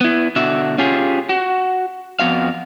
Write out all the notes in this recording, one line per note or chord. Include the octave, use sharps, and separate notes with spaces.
B3 E4
B2 D3 F#4 E5
C#4 F4 G4 G#4
F#4
F2 B3 F#4 F5